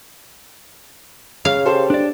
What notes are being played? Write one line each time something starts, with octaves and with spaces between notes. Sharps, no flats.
C#3 F5
G4 A4 C5
D4 D5